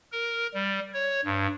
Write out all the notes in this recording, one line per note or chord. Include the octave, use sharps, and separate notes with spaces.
A#4
G3
C#5
G2